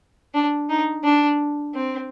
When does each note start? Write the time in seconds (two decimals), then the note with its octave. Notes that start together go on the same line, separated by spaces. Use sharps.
0.34 D4
0.70 D#4
1.04 D4
1.75 C4